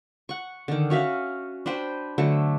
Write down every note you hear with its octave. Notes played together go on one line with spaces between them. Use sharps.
F#5 C#6
D3 D#3
C#4 F#4 E5 F5
D4 B4 C5 G5
D3 F#3 A3